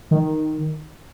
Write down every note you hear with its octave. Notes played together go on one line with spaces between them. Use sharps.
D#3